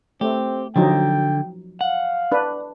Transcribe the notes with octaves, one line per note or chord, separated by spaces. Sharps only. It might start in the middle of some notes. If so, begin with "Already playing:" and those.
A3 C4 G4
D3 F3 F#3 D#4 G5
F5 F#5
D4 B4